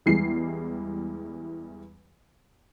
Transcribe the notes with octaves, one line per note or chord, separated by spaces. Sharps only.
E2 E3 G3 G#3 C7